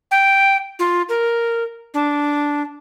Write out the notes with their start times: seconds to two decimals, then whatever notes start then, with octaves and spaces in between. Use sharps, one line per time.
0.11 G5
0.79 F4
1.09 A#4
1.94 D4